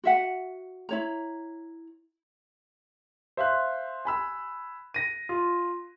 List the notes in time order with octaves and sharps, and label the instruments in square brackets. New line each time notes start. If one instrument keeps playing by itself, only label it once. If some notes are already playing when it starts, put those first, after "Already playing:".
[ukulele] F#4 E5 F#5
E4 C#5 A#5
[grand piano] C5 E5 F5 F#6
G#5 B5 E6
A#6 D#7
F4